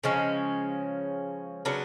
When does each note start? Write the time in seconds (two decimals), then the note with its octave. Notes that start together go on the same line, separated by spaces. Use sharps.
0.04 C#3 F3 G#3 C#4
1.65 C#3 F#3 B3 D4